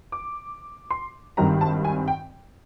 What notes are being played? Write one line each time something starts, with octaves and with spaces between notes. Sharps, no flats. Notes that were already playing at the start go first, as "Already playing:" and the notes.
D6
C6
G#1 G2 D#3 G3 C4 A#5
A5
G#5
G5